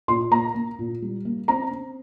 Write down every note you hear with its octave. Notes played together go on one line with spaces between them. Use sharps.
A#2 C6
A#3 A#5
A#3
A#2
G3
A#3
C4 A#5
C4